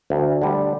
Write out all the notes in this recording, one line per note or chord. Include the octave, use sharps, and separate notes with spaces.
D2
D3 G3